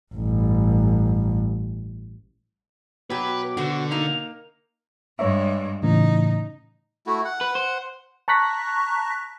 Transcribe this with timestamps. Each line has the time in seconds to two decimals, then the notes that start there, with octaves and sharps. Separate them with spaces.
0.14 A1 G2
3.10 B2 F#3 G4 B4 D6
3.57 D3 F#4 C5
3.91 A#3 D#4 F7
5.19 G2 G#3 C#5 E5
5.83 A2 C#3 E3 D#4
7.06 A3 E4 F#4
7.25 F#5
7.41 B4
7.55 C5
8.28 A5 A#5 C#6 F#6 A#6 B6